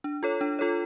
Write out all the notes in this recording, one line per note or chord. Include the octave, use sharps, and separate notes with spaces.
D4
F4 A4 C#5
D4
F4 A4 C#5